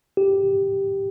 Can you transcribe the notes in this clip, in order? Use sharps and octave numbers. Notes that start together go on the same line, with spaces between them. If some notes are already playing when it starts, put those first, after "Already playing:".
G4